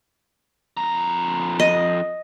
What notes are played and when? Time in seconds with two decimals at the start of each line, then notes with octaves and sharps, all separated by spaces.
0.77 F2 A#5
1.60 D#5